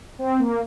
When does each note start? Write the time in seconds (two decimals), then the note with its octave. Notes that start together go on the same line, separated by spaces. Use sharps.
0.19 C4
0.40 A#3